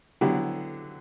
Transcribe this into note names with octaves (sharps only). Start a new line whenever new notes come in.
D3 F#3 B3 E4 G4